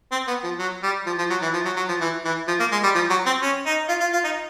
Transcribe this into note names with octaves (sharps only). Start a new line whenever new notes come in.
C4
B3
F3
F#3
G3
F3
F3
F#3
E3
F3
F#3
F#3
F3
E3
E3
F3
A#3
G#3
G3
F3
F#3
C4
C#4
D#4
F4
F4
F4
D#4